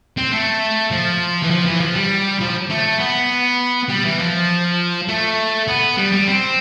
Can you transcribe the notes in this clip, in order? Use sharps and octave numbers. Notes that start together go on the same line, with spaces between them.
C4
A3
F3
E3
F3
E3
F3
G3
F3
A3
B3
G3
E3
F3
A3
B3
G3
G3
C4